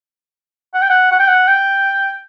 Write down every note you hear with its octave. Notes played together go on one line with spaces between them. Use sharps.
F#5
G5
F#5
F#5
G5
F#5
G5